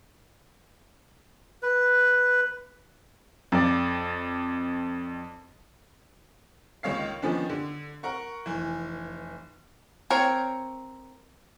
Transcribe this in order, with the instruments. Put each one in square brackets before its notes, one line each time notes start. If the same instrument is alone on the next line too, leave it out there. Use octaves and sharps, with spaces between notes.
[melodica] B4
[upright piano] F2 D5
[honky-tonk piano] C#2 D#3 C#5 F5 C7
D#3 F3 B3 C#4 D4
D3
A#4 F#5 C#6
F1 E3
[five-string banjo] C4 A#4 C5 C#5